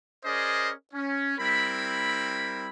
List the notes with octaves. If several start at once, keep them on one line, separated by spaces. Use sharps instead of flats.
C#4 G#4 A#4 C5 D5 D#5
C#4
G3 C4 E4 A#4 B5